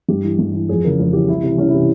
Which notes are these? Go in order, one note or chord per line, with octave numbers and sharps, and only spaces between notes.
G2 G4
E3
G2
E3
F2 G#4
C#3 E3 A#4
F2
C#3 E3 G4
C2 E4
C3 E3
C2 C#4
E4
C3 E3